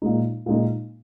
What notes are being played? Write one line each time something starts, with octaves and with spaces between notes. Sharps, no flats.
A#2 G#3 D#4
A#2 G#3 D#4